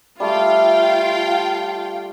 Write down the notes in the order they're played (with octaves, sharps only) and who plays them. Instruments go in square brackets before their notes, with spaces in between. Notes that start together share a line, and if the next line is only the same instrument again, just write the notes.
[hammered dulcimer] G3 A3 [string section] F4 F5 G5